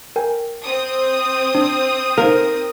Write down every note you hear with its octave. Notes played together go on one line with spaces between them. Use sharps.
A#4 G5 G#5
C4 D#6
D4
D#4 A#4 C5 F5